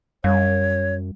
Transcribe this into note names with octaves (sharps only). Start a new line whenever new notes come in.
F#2 G3 C#5